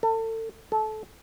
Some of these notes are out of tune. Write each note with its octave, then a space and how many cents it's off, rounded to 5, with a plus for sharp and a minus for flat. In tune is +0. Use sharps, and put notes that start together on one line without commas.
A4 +35
A4 -20